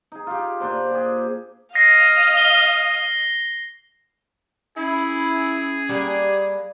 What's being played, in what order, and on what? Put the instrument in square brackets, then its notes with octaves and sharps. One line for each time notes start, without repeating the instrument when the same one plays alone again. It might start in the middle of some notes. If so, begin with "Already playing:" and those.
[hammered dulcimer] D#4 G#4
F4 G4
A#2 D4 C5
G4 G#4
[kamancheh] D#5 F5 [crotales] A#6 C7
[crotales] G7
[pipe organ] C#4 [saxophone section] E4 [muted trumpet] G#4
[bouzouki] G3 A#3 F#5 [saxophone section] G4